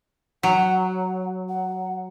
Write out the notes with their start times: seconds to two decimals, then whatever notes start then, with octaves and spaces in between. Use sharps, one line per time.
0.43 F#3 F#5
1.49 F#5